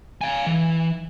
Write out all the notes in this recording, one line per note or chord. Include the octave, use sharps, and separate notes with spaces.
F5 G#5
E3